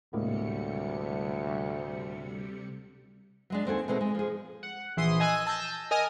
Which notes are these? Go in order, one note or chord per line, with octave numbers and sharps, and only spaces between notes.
D2 A2 C3 G3 G#3 A#3 C#7
F#3 G#3 D4
D#2 C4 F#4 A4 G#5
B2 G#3 A3 C4 D#4
G#3
F3 G#4
F#5
A#1 E3 C6 D#6
D#5 G#5 E6 F#6 D#7
A5 E6 G6 A#6
A#4 D#5 G#5 D#6 F6 A#6